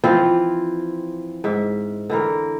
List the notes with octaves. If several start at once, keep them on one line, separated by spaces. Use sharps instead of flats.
E3 F3 C4 F4
G#2 E5
D3 E3 A#4